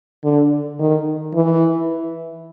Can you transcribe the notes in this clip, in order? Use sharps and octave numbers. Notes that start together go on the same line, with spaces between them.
D3
D#3
E3